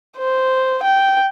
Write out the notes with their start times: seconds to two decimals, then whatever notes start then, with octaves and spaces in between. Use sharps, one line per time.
0.18 C5
0.83 G5